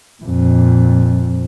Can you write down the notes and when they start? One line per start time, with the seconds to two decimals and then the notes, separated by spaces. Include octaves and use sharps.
0.23 F2 A#2